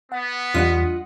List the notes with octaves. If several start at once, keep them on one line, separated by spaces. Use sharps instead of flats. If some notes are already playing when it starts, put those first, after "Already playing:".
B3 F#5
E2 G3 D4 F4 D#5 F#5